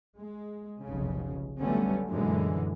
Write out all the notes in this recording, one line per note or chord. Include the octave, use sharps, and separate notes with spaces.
G#3
F1 B1 C#3
D3 F#3 G3 A3 B3 C#4
F#2 A#2 D3 E3 G#3